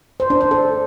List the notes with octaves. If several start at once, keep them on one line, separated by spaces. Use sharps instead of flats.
C5
D4
C5
A4